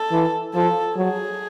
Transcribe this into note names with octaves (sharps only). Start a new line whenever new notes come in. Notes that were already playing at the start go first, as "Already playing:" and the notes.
Already playing: A4
E3
F3 A4
F#3 G#4